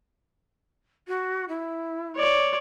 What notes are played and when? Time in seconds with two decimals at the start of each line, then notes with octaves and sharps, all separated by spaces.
1.08 F#4
1.49 E4
2.16 C#5 D5